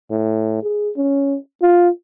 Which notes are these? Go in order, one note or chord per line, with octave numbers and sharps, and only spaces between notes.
A2
G#4
C#4
F4